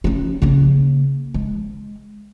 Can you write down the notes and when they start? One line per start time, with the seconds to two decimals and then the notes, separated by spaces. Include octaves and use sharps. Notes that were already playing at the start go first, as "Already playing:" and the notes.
0.04 C#4 D#4
0.42 C#3 A#3
1.34 G#3